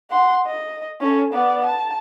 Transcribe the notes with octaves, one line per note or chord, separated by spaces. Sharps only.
F#5 C6
D#5
C#4 A4
B3 D5
A5